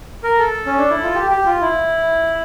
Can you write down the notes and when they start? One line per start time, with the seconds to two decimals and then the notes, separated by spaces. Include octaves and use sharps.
0.24 A#4
0.39 A4
0.66 C#4
0.78 D4
0.90 E4
1.03 F4
1.15 G4
1.30 G4
1.46 F4
1.61 E4